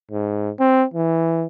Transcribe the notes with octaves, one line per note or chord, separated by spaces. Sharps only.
G#2
C4
E3